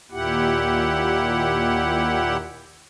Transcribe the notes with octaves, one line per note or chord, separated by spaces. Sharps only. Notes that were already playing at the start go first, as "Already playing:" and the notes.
D#2 A#2 E4 G4 F#5